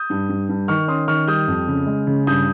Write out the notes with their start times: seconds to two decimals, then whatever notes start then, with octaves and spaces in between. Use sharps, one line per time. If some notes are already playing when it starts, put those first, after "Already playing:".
Already playing: D#6 G6
0.10 G2
0.29 G2
0.49 G2
0.68 D#3 C#6 F6
0.88 C#4 C6 D#6
1.08 D#3 C#6 F6
1.28 G3 D#6 G6
1.48 F2
1.68 C#3
1.87 G#3
2.07 C#3
2.27 G2 D#6 G6